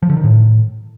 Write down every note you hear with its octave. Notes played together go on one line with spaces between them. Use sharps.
F3
D3
D#3
A2